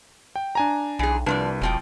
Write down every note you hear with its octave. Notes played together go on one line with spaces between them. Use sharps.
G5
D4 G#5 A#5
B1 E3 G#4
C2 F3 D4 B4 C5 D5
E1 B2 F3 G5